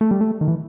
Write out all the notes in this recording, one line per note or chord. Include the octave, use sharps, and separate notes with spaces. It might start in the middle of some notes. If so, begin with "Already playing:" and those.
A3
G3
A3
D#3
E3